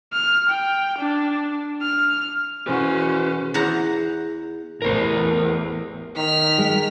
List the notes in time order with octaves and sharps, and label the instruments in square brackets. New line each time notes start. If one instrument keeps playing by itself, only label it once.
[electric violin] F6
G5
D4
F6
[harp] E1 [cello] C#4 [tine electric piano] E4 F#4 [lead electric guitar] B4 C5
[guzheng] E2 C5 F#5 A#5
[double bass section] A1 E2 [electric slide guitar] A#4 C5
[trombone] D#3 [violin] F6 B6
[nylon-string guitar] G#3